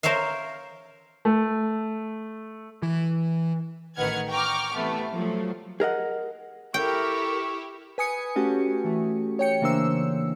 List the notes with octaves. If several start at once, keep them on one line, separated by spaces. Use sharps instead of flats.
A#4 C5 C#5 E5 F5
A3
E3
A1 D#3 B4 F#5 F6 G#6
G5 A#5 C#6 D6 F6
C3 E3 A3 B3
F3 F#3 A3
G#4 A#4 D#5 F#5
E4 G4 A4 A#4 G5 C#6
B4 G#5 D#6 C#7
A3 C#4 F#4 G4
E3 A3
C#5 G5 C#7
C#3 E3 A#3 D4 C5 E6